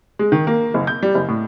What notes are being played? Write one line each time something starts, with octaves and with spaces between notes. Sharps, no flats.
G#3
D#3
A#3
F#1
G6
G3
F#1
A2